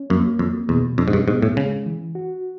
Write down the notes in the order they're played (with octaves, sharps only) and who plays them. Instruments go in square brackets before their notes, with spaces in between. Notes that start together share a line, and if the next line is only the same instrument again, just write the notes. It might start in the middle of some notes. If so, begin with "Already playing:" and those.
Already playing: [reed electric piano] C#4
[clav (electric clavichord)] F#2 [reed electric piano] A#3
[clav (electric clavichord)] F2 [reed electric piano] F#3
[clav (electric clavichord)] E2 [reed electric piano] B2
[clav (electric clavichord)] F2 [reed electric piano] D4
[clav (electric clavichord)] G#2
G2
[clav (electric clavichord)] G#2 [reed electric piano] B3
[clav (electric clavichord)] A2
[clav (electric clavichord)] C#3 [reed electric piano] G#3
[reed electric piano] E3
F#4